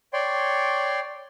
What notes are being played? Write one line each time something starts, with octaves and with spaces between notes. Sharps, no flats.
C#5 D5 G5 C6